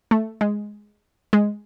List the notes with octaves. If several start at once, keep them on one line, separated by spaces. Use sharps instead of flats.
A3
G#3
G#3